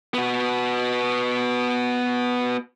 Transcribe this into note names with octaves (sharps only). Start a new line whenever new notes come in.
B3 F#4